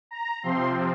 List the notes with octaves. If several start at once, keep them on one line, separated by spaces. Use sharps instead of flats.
A#5
C3 F3 C4 C6